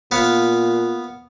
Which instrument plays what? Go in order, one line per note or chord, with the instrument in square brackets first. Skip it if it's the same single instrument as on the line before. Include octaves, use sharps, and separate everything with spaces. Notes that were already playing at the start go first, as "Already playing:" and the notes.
[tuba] A#2 [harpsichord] B3 B4 F5